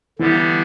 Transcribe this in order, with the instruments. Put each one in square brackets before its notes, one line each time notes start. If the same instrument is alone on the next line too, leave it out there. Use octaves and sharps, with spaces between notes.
[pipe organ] D3 G3 B3 G4 [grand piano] E3